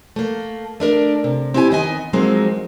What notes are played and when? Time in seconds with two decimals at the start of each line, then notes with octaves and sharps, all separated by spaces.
0.16 A3 A#3
0.80 A3 D4 A#4
1.24 C3
1.54 C4 E4 G4 D5 G#5
1.71 D#3 B3 D#5 G#5
2.13 F3 F#3 G#3 A#3 C4 D#4